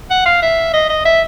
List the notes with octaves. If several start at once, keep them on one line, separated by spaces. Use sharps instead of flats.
F#5
F5
E5
D#5
D#5
E5